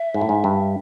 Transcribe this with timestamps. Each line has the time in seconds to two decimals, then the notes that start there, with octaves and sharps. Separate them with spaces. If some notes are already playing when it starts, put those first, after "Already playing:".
Already playing: E5
0.14 G#2
0.21 A2
0.29 G#2
0.44 G2